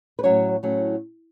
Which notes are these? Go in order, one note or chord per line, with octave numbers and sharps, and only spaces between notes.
B4
A2 F#3 C#4 C#5
A2 F#3 C#4